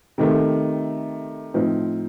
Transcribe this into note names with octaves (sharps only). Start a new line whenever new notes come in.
C3 D#3 A3
A2 F3 C4 D#4